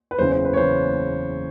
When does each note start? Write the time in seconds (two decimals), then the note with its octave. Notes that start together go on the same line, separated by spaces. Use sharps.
0.11 B4
0.19 F#1 E2 C#3 E3 C5
0.32 C5
0.45 B4
0.53 C#5
0.57 C#3 E3 C5